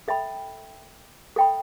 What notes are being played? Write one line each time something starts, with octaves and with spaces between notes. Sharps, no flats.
A4 E5 G5 B5
A4 E5 G5 B5